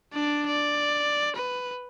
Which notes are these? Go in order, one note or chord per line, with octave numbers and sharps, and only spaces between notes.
D4 D5
D5
B4